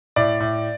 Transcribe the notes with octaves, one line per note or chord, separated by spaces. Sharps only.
A2 D5
A2